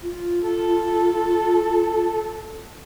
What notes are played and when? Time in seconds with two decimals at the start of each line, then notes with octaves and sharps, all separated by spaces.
0.03 F4
0.41 A4